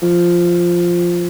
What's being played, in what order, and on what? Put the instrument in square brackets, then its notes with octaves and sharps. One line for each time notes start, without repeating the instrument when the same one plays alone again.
[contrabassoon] F3